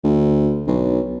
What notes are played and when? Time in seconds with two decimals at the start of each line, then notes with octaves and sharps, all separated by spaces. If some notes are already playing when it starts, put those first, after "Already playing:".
0.04 D2
0.67 B1